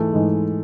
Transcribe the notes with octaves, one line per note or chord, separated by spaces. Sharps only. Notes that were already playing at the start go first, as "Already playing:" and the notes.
Already playing: G#2 E3 G#3 A3
G#2 E3 G#3